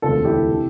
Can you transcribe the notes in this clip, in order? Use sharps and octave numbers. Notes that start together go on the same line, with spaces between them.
E1 D2 C3 G3 F4 A4
E4 G4
C3